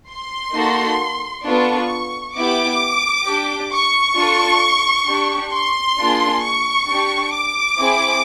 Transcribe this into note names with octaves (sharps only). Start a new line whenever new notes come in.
C6
A#3 D#4 F#4 A4
B3 D4 F4 A4 C#6
B3 E4 G4 D6
D4 G4
C#6
D4 F4 A4
D4 G4
C6
A#3 D4 F4 G#4
C#6
D4 G4
D6
C4 E4 G#4